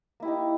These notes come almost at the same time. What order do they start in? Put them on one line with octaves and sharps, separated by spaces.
A#3 E4 G4 D#4